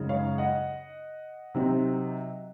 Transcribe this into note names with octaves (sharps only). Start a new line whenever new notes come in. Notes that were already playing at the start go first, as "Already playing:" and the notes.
Already playing: F#2 C#3 G#3 D#4
C#5 F5
D#5 F#5
C3 F#3 C4 D#4